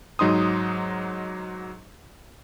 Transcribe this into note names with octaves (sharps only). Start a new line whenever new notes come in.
G#2 F#3 D#4 C6 D#6